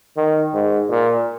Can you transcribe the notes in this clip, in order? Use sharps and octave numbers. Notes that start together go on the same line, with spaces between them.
D#3
G#2
A#2